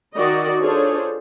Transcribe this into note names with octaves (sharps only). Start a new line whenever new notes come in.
D#3 F#4 D5 D#5
D4 F4 G#4 A4 C5 C#5